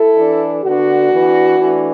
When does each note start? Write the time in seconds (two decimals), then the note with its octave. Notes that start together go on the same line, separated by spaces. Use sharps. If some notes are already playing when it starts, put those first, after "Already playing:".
Already playing: E4 A4
0.17 E3 D4
0.64 D3 B3 D4 F#4
1.12 E3 B3 D4
1.59 E3 A3 D4